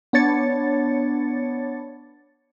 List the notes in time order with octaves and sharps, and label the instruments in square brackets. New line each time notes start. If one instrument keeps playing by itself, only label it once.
[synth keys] B3 D4 C#5 A6 C#7